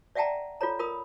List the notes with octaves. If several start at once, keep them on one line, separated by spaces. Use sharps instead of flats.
D5 E5 F#5 G5 A5 A#5
F4 A4 C#5 A#5
F4 A#4 B5 D#6